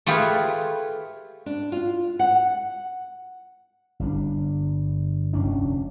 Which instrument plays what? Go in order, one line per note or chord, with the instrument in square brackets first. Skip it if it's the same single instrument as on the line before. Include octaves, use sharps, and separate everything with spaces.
[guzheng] A3 F4 G4 G#4 B4
[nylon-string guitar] D4
F4
F#5
[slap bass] G1 G3 D4
F1 C#2 C#4 D4